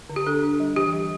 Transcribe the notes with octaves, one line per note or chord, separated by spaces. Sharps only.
D3
G4
D4 A4
D4
G3
E3 G4
G3